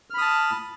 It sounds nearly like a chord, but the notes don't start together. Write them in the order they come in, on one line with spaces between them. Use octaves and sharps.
F6 B5 D#6 A5